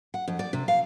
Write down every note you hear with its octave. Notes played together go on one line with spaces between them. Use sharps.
F#5
F2
D5
C3
F5